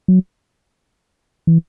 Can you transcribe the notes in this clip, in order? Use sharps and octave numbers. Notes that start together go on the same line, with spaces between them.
F#3
E3